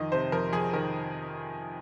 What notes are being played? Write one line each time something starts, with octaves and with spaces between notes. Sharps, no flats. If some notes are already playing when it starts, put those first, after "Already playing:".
Already playing: F2 D#3 D#5
C3 C5
F2 A#4
F2 G#4
D#3 A#4